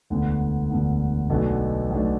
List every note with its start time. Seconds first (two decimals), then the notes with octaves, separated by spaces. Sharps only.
0.10 E1 D2 D3 B3
0.70 E1 D2 D3 B3
1.30 B1 B2 A3 D4
1.90 B1 B2 A3 D4